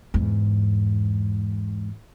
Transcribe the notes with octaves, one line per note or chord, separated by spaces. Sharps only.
E2 G#2